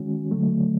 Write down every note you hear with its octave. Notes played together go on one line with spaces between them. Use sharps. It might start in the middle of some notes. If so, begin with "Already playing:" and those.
Already playing: D#3 G#3 C#4 F#4
D3 F#3 A3